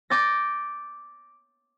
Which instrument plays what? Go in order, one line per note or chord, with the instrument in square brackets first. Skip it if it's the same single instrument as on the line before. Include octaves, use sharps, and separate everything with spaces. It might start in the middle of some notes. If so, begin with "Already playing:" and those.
[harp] D6 G6 A6 A#6